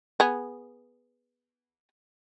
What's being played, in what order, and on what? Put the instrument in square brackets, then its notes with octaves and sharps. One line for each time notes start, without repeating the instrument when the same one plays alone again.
[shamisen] B3 G#4